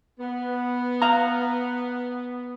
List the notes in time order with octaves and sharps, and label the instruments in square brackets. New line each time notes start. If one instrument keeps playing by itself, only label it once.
[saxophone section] B3
[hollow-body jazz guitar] F5 A#5